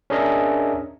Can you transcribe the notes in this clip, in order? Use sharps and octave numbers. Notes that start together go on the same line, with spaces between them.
C#4 D4 G#4 A#4 D#5 E5